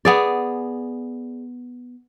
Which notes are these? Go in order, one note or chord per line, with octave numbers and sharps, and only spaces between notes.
B3 G#4 D5